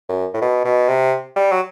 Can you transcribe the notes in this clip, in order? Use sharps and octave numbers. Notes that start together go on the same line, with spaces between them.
F#2
A2
B2
B2
C3
G3
F#3